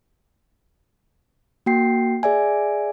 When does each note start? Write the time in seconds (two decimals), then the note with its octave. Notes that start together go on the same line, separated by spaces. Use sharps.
1.66 A#3 F#4 G5 C7
2.23 G#4 D5 E5 G#5